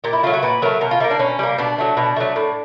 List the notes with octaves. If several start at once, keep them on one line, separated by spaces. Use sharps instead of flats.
A#2 G4
E4
F#3 A3 F4
F#4
A#2 B4
F#3 A3 A#4
B2 A#4
F4
G3 A#3 E4
D4
B2 C#4
G3 A#3
B2 D4
F#3 A3
B2
F#3 A3
A2